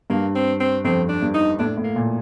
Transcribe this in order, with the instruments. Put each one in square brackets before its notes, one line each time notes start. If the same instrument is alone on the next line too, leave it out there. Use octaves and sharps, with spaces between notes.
[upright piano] G2 [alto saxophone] A#3
[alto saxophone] C4
C4
[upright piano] F2 [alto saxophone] C4
[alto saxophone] D4
[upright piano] G2
[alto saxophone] D#4
[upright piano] A2 [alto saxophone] D4
[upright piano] A2
[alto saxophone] A#3
[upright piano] A#2